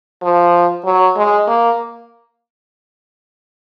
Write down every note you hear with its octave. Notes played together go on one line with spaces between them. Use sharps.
F3
F#3
G#3
A#3